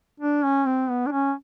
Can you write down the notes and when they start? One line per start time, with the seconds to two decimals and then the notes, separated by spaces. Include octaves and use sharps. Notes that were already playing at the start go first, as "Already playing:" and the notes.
0.20 D4
0.43 C#4
0.66 C4
0.89 B3
1.06 D4
1.11 C#4